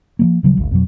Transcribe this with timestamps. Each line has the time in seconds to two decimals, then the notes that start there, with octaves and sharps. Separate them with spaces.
0.19 F3 F#3 A#3
0.43 D#1 C#3 F#3 G3
0.57 G#1 D2
0.71 F2 B2 F#3